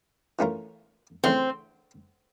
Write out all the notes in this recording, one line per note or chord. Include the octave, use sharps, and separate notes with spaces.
E3 A3 C#4 F4 A#4
C#3 E3 A3 C4 C#4